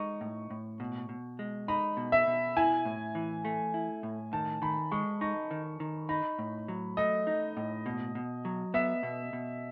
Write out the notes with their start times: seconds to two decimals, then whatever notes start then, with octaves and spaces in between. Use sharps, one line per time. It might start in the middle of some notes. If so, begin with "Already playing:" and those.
Already playing: G#3 D#4 C#6
0.21 A2
0.50 A2
0.80 B2
1.09 B2
1.39 G#3
1.68 D#4 B5
1.97 B2
2.12 E5
2.27 B2
2.57 E4 G#5
2.85 A2
3.15 E3
3.45 A3
3.74 E4
4.03 A2
4.33 D#3 A5
4.62 D#3 B5
4.92 G#3 C#6
5.21 D#4 C#6
5.51 D#3
5.80 D#3
6.09 D#4 B5
6.39 A2
6.68 F#3
6.97 A3 D#5
7.27 D#4
7.57 A2
7.86 B2
8.15 B2
8.45 F#3
8.74 B3 E5
9.03 B2
9.33 B2